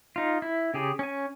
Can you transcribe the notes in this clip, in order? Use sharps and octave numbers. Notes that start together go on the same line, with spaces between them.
D#4 F4
E4
C#3 G4 G#4
C#4 G#5